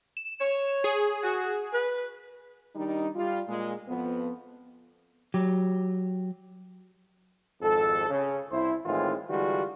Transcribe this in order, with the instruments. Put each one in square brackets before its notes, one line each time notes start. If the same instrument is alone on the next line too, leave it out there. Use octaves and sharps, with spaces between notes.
[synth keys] E7
[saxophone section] C#5
[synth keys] G#4
[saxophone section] F#4
B4
[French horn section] D#3 G3 D4 D#4
G3 F4
A#2 G#3
F2 F3 B3
[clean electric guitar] F#3 G4
[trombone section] G#1 F2 G#2 A4
C#3
C2 E4 C5
A2 D#3 E3 G#3 C4 F4
D3 E3 G3 G#3 F4 F#4